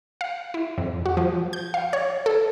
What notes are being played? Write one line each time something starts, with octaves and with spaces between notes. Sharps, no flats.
F5
E4
F2
F#4
F3
G6
F5
C#5
A4